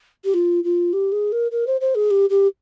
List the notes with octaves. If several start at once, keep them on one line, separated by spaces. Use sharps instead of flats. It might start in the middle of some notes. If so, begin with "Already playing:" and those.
G4
F4
F4
G4
G#4
A#4
A#4
C5
C5
G#4
G4
G4